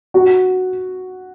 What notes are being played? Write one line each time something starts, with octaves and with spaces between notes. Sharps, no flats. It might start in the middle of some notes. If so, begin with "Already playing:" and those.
F#4